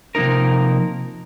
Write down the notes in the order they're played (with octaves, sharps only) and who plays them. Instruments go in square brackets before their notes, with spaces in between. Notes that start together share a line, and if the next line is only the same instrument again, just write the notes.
[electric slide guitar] C3 F3 A#3 D#4 A#4